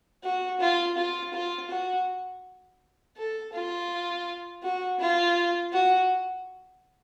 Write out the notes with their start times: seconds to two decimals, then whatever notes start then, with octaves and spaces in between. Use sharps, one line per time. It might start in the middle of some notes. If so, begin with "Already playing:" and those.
0.24 F#4
0.61 F4
0.97 F4
1.33 F4
1.70 F#4
3.17 A4
3.53 F4
4.63 F#4
5.00 F4
5.72 F#4